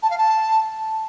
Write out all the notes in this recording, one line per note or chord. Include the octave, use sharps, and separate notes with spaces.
A5
F5
A5